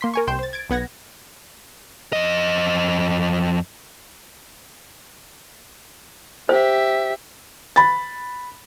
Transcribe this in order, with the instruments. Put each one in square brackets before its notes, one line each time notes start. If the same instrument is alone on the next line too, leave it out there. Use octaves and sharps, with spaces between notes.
[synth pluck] A#3 C6 B6
A#4 G#5 C#6
C2 G5 C6 G6 E7
C5 A6
G#6 A6 D7
B1 B3 F#5 G#6 A#6
[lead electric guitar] F2 D#5
[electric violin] G4 E5 [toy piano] C5
[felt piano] B5 A6